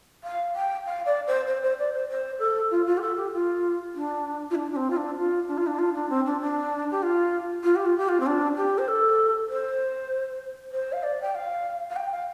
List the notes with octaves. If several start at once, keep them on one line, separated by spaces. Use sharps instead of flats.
F5
G5
F5
D5
C5
C5
C5
D5
C5
C5
A4
F4
F4
G4
A4
G4
F4
D4
F4
D4
D4
C4
F4
D4
F4
D4
F4
D4
F4
D4
C4
D4
D4
G4
F4
F4
G4
F4
G4
F4
C4
D4
G4
C5
A4
C5
C5
F5
D5
G5
F5
F5
G5
F5